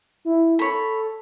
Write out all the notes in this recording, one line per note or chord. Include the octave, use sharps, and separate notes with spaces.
E4
A4 C#5 B5